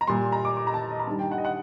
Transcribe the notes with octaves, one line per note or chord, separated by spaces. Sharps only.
A#5
A#2 G3 C6
A#5
D6
D6
A#5
A5
D#5
A#5
G2 D#3 G3 A5
G5
F#5
D#5
F#5